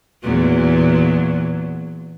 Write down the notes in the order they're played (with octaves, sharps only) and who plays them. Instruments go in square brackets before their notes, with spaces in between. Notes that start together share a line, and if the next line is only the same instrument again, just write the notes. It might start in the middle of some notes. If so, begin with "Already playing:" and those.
[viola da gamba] E2 A#2 F#3